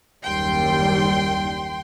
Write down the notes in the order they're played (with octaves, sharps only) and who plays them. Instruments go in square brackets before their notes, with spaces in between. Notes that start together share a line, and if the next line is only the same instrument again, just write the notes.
[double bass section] F#1 D#2 G3 [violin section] G5 C6